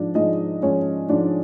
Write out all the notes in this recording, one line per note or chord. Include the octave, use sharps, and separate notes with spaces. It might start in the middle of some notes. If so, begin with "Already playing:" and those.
Already playing: G#2 F3 G#3 D4 D5
G#2 F3 G#3 D#4 D#5
G#2 F3 G#3 C#4 C#5
G#2 F3 G#3 D4 D5